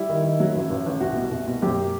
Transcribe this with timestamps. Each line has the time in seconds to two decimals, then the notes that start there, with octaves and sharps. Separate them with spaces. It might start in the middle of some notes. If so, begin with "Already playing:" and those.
Already playing: G3 E4
0.09 D#3
0.24 D#3
0.40 F#3
0.55 A1
0.70 A1
0.86 A1
1.00 C2 F#4
1.16 B2
1.31 C2
1.47 B2
1.62 F#2 G4